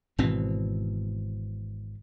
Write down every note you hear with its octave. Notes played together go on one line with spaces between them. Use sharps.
G#1 B2 E3 C4